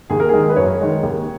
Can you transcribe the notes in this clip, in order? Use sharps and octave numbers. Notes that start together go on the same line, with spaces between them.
D#2 G#4
A#4
D#3 G#3 G#4
B4
F#2 C#5
D#3 G#3
D#2